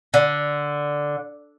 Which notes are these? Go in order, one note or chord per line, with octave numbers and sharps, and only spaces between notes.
D3